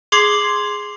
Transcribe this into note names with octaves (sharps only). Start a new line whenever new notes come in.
G#4 C6 D6 G#6 C7 F#7